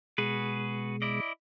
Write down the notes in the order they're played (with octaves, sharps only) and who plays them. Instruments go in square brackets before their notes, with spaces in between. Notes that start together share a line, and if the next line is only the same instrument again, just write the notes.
[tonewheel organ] B2 G#3 [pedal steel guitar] F#4 G#4 B4
[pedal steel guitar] E4 D5 D#5